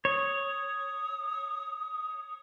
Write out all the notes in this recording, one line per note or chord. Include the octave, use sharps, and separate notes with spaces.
C#5 D#6